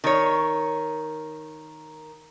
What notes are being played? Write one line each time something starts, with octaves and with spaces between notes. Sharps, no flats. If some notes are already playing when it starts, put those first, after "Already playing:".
D#3 C#5